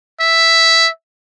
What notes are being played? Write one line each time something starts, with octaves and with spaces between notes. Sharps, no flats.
E5